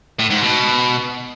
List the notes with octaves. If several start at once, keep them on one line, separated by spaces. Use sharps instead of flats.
A2
G#2
B2